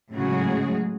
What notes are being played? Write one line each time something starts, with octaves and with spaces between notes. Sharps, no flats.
A2 C#3 F#3 G#3 F#4 G#4